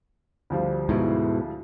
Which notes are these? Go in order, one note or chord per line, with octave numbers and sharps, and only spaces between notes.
D2 F3 G3
G#2 B2 E4